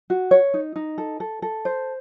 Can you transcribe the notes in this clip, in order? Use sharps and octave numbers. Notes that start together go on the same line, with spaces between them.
F#4
C#5
D#4
D#4
A4
A4
A4
C5